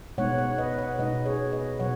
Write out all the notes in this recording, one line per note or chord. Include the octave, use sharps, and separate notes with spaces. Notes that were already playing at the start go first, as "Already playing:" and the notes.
B2 G#3 B3 D#4 C#5 F#5
C#5 F#5
B4 D#5
C#5 F#5
B2 G#3 B3 D#4 B4 D#5
G#4 C#5
B4 D#5
B2 F#3 C#5 F#5